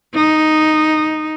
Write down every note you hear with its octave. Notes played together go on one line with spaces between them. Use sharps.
D#4